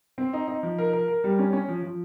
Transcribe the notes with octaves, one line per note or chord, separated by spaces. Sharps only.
C4
D#4
D#4
F3
A#4
A#4
A#4
G3
C#4
C#4
F3
F3